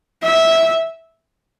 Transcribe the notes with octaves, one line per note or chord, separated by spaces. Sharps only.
E5